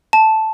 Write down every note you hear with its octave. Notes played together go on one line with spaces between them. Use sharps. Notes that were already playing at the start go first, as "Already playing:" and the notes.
A5